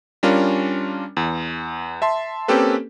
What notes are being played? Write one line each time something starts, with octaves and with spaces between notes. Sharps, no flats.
G3 C#4 D4 F4 A#4
E2
E5 A5 C6
A#3 C4 C#4 G4 A4 B4